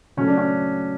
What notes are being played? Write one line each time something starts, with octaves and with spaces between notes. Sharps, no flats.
C#3 F#3 A3 C#4
D4
C#4